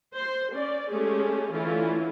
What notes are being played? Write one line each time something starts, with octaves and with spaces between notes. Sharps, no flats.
C5 C6
C#4 D5
G#3 A3 C#4 G4 G#4
D3 E3 A3 C#4 E4 F4